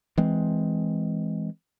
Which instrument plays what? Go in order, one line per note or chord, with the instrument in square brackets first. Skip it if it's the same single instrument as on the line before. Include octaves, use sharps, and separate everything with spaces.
[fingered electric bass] E3 G#3 C4